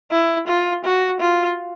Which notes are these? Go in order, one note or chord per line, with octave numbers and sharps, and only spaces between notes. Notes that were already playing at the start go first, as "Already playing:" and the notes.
E4
F4
F#4
F4